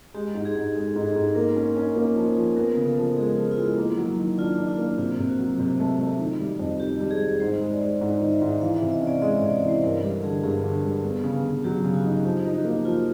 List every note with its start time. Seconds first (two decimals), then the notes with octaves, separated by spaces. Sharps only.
0.14 G#3 G4
0.35 G#2
0.45 G#4
0.55 G#2
0.75 G#3 A4
0.96 G#2
1.06 G#4
1.16 G#2
1.35 A#3 A#4
1.56 C#4
1.76 C#4
1.96 A#3
2.16 F3
2.37 F3
2.57 B3 A#4
2.77 C#3
2.87 A4
2.98 F3
3.16 G#3 G#4
3.38 F3 F4
3.51 F4
3.57 G#3 E4
3.77 A#3
3.97 F#3
4.17 D#3
4.38 D4 F4
4.58 D4
4.68 F4
4.78 A#3
4.98 C3 F4
5.19 C3
5.29 F#4
5.39 F#3
5.60 C3
5.80 A3
6.00 A3
6.19 D#3
6.40 G3
6.59 F2
6.80 D#3 G4
7.00 G3
7.11 G#4
7.21 G3
7.40 G#2 C5
7.61 G#3
7.71 D5
7.81 G#3
8.01 G#2 D#5
8.21 D#3
8.32 E5
8.41 G#2
8.61 E3 F5
8.76 E5
8.82 C3
8.92 D#5
9.02 C#4
9.07 D5
9.22 G#3 D#5
9.37 C3 D5
9.53 C#5
9.63 E3
9.68 C5
9.83 G2 A#4
10.03 G3 A4
10.23 D3 G#4
10.43 G2 G#4
10.64 D3
10.84 G3
11.04 B3
11.24 C#3
11.44 C#3
11.64 F#3 G4
11.84 C#3
11.94 F#4
12.04 D#4
12.25 F3 G4
12.45 D#4
12.55 F#4
12.65 A#3
12.85 F3 F4